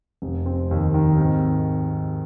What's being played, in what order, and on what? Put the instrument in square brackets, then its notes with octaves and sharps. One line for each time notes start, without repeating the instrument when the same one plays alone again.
[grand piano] F1
C4
D#2
D#3
G#1